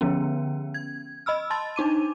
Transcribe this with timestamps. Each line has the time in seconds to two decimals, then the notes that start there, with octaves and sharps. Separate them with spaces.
0.01 D3 F3 B3 C#4
0.74 G#6
1.26 D#5 B5 E6 F6
1.50 A5 C6 A6
1.76 D4 D#4 D6 D#7